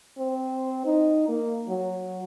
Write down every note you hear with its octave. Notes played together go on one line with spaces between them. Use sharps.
C4
D#4
A#3
F#3